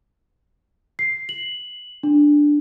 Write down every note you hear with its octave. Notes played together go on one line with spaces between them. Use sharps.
C7
F#7
D4